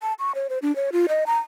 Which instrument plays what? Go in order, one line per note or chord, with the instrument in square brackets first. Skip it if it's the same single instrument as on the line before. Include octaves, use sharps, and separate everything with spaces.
[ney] A5
C#6
C#5
C5
D4
C#5
F4
D#5
A#5